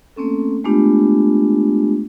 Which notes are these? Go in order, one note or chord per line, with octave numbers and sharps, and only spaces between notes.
A3 A#3 C4 C#4 A4
G#3 A3 B3 D4 F4 G4